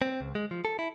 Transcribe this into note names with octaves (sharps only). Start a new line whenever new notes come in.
C4
C#2
G#3
F3
A4
E4